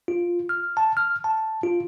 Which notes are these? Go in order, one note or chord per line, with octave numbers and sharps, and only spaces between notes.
F4
F6
A5
F6
A5
F4